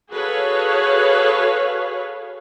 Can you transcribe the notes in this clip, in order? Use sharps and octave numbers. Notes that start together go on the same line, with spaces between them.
F#4 G#4 A4 B4 C#5 F5